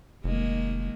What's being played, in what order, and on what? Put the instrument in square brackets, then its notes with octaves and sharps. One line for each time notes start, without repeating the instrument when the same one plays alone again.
[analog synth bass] F1 [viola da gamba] D#3 G#3 A#3